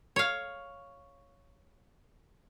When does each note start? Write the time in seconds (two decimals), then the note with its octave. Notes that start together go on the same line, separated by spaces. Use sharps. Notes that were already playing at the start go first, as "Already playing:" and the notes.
0.16 C#5 F5